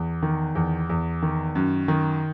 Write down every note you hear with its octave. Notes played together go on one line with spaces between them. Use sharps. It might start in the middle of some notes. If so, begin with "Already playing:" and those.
Already playing: E2
D#3
E2
E2
D#3
F#2
D#3